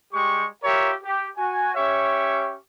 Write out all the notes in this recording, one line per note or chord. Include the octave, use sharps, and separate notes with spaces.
G3 G#3 G4 C#6
F4 G4 A#4 C#5 E5
G4
F#4 G#5
C#4 G4 C#5 E5 C#6